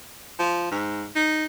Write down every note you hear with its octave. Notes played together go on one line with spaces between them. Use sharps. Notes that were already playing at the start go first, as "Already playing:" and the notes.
F3
G#2
D#4